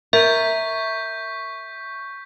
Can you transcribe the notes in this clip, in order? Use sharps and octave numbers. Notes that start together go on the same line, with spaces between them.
A#4 E5 C#6 G6 B6